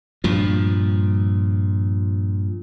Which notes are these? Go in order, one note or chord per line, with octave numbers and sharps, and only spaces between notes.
G2 A#2 F3